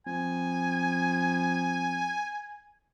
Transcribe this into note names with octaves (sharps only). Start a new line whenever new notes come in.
F2 G#5